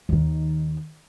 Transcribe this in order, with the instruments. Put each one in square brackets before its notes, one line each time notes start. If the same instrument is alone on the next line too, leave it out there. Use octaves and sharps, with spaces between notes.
[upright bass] D#2 D#3